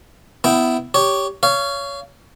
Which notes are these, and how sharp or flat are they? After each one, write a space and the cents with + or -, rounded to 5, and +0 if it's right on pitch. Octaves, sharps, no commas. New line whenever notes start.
B3 +20 E4 +0 G5 +0
G4 +0 C#5 +10
C#5 +20 F5 -20